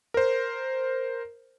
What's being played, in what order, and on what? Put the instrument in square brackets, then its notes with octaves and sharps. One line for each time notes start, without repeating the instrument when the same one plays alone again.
[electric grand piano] A#4 C5